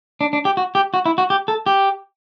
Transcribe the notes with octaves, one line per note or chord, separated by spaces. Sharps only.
D4
D4
G4
F#4
G4
F#4
E4
F#4
G4
A4
G4